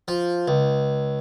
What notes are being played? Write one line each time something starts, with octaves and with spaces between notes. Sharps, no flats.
F3
C#2